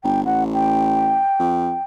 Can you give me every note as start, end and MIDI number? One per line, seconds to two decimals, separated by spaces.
0.04 0.24 31
0.04 0.21 79
0.25 1.21 33
0.25 0.44 78
0.54 1.84 79
1.39 1.76 41